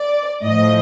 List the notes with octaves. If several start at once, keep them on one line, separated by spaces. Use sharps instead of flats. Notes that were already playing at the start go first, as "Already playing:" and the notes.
Already playing: D5
A2 F3 D#5